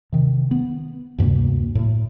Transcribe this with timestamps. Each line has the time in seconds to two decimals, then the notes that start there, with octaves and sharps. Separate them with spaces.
0.12 C3 D#3
0.51 B3
1.18 D2 G2 C3 A#3
1.75 A2